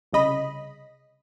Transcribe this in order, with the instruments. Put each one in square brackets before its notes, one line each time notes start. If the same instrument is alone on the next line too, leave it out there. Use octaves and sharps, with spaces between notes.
[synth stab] C2 C#3 D#5 B5